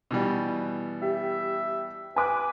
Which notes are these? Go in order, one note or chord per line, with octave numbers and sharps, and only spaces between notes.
B2 E3 G3
G4 E5
B4 G#5 D6 F#6